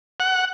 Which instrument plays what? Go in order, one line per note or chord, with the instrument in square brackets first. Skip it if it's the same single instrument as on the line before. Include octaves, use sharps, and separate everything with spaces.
[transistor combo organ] F#5